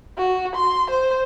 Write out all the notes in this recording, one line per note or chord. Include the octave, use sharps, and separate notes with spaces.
F#4
C6
C5